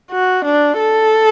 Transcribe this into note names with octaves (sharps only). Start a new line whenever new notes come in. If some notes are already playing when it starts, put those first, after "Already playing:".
F#4
D4
A4